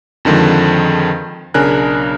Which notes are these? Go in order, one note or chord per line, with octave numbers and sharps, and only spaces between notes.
F2 D3 D#3 F3 G#3
B1 C#3 D4 A#4 G#5 F#6